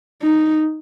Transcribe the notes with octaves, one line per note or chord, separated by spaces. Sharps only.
D#4